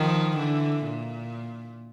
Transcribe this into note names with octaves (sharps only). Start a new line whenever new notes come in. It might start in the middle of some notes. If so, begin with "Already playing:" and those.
Already playing: D#3 F3
D3 E3
A#2